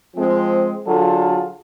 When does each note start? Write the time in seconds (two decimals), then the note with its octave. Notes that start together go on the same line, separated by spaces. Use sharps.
0.16 F3 G#3 C4
0.87 D3 F#3 F4 G#4 A4